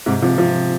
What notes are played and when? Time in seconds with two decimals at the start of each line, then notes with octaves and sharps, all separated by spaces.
0.06 G#2 C3
0.22 C3 F3
0.38 C3 F3